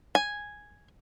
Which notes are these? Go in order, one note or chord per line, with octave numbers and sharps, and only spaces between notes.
G#5